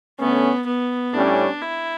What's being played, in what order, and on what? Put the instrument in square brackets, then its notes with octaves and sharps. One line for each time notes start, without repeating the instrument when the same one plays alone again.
[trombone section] D3 A3 C#4 [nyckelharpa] B3
[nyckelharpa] B3
[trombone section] A2 G3 C#4 [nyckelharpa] D4
[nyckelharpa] E4